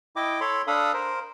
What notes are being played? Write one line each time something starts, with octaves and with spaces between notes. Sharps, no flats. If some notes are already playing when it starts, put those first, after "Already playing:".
E4 D#5 G5 D6
A4 C#5 B5 C6
D4 A4 F5 B5 D#6
A#4 C5